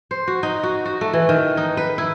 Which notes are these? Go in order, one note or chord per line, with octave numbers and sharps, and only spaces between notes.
C5
F#4
D#4
F#4
F#4
A3
E3
D#3
D#4
B4
E4